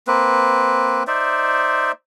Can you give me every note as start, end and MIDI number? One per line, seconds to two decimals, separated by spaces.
0.07 1.03 58
0.07 1.03 60
0.07 1.03 71
1.07 1.92 63
1.07 1.92 72
1.07 1.92 74
1.07 1.92 76